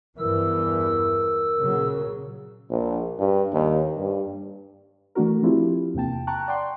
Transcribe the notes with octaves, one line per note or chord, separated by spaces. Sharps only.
E2 G2 E3 A#4 E6
A#2 C#3 F#3
A#1
G2
D#2
G2
E3 A3 D4 F#4 A#4
F3 C4 D4 E4 F4 G4
E2 C3 A#3 G5 A5
G5 A5 A#5 C#6 F#6
D5 F#5 G5 C6